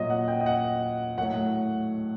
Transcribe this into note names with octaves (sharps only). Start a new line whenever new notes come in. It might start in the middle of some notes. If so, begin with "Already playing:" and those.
Already playing: A#2 F#3 D#5
F#5
G5
D#5
F#5
A2 F#3 F#5